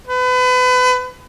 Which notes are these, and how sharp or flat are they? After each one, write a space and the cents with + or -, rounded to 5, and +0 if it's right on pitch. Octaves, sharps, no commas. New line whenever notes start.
B4 +30